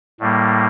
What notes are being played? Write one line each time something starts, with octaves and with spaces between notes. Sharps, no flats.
A2 G3 A#3